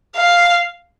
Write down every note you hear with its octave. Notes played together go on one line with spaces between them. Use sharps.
F5